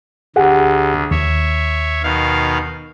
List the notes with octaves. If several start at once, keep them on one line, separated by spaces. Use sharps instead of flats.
D2 G4 G#4 F#5
D#2 C#5 E5
B2 D#3 F5